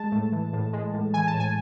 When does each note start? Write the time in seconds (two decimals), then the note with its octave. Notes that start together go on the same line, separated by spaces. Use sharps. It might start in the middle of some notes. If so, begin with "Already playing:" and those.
Already playing: G#3 A5
0.12 A2
0.32 E3
0.53 A2
0.73 G#3
0.94 A2
1.13 E3 G#5
1.27 A5
1.34 A2
1.40 G#5